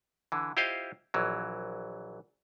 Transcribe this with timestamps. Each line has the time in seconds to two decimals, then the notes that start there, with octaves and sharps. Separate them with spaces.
0.32 D3 E3
0.57 E4 F4 G4 C5 D#5 F5
1.14 A#1 E3 F#3